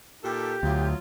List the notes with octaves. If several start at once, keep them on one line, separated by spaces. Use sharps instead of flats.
A#2 D#4 G4 A4
D2 F#3 F4